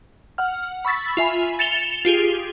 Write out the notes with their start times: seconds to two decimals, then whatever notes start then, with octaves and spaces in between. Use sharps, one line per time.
0.38 F#5 F6
0.85 B5 C#6 E6 A6 B6
1.17 F4 E5 G#5 B5
1.59 A6 C#7 E7 F7 G7
2.05 F4 G4 G#4